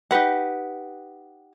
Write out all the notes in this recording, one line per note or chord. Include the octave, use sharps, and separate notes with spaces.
D#4 G4 B4 F#5